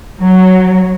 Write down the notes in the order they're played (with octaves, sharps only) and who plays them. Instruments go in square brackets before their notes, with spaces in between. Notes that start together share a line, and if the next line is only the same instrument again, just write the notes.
[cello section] F#3